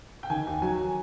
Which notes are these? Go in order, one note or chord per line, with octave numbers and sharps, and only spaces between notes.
G5
D#3 G#5
D#2
F#3 G#5